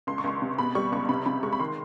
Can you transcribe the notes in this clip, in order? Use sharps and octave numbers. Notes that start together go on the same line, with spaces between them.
C#2 C6
C#6
C#2 C6
C3
B2 B5
G3 C#6
C#2 C#6
C3 B5
C3 B5
G#3 C#6
B5
D#3 C6